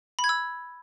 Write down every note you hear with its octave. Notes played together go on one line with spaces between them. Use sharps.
B5
G#6
E6